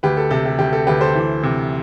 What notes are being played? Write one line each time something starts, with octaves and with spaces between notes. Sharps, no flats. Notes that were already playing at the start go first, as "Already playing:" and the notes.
D2 G4 B4
A4
C3 A4
G4
D2 G4
A4
D2 G4 B4
A4 C5
E3
C3